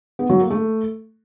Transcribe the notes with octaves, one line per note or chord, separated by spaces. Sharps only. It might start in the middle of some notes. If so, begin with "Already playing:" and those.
B3
F#3
A#3
A3